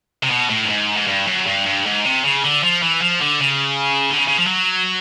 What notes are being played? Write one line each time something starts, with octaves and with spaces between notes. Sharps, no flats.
C3
B2
A2
G2
G#2
G#2
G2
F#2
G2
G2
G#2
C3
C#3
D3
F3
E3
F3
D3
C#3
D3
C#3
C#3
F3
F#3